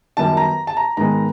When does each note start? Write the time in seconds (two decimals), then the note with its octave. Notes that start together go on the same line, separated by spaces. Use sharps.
0.17 F#2 D#3 G3 B3 A5
0.37 A#5
0.67 A5
0.77 A#5
0.97 G#2 D#3 G#3 B3 A#5